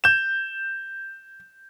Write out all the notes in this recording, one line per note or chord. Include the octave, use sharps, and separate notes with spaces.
G6 E7